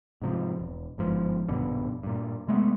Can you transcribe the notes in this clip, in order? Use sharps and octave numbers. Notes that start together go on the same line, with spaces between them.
G#2 C3 F3
E1
G1 G#2 F3
A#1 G2 B2 D3
G2 A#2
C3 G#3 A3 B3